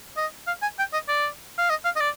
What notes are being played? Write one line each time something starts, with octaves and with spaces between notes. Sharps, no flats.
D#5
F5
G#5
G5
D#5
D5
F5
D#5
F5
D#5
D5